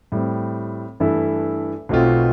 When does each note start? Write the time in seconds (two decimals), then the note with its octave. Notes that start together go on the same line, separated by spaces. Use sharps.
0.12 A2 G3 C4
1.00 G2 E3 A3 E4 A4
1.89 B1 B2 A3 C4 F4